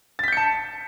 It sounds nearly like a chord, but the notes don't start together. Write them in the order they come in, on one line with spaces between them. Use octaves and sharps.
A6 B6 G6 C#7 A5